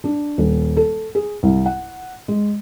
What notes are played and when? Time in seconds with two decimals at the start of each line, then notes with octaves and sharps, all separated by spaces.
0.04 D4
0.38 D#1
0.77 A4
1.15 G#4
1.43 C2
1.66 F#5
2.28 G#3